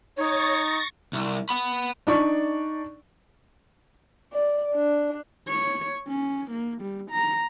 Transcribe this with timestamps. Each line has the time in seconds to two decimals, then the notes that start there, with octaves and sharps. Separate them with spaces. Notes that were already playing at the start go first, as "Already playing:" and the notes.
0.18 D#4 C#5 C#6 A6 A#6
1.13 C2
1.49 F#5 B5
2.07 D4 D#4 D5 C#6
4.33 D5
4.75 D4
5.48 C#5
6.08 C#4
6.51 A#3
6.81 G3
7.11 A#5